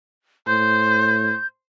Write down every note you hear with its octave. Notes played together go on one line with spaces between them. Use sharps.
A2 C5 G6